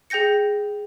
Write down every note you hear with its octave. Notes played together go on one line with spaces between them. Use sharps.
G#4 G5 G6 A#6 C#7